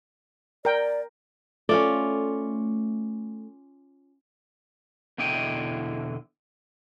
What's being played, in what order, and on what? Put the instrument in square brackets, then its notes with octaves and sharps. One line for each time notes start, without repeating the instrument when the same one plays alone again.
[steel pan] A#4 G5 [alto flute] D5
[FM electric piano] A3 [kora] C#4 F4 D5
[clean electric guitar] E2 B2 D3 E4 D#5 G5